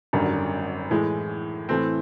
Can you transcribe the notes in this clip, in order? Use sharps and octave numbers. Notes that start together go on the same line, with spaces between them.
G#1 F#2 D3 G3
A2 E3 G#3
A2 E3 A3 C4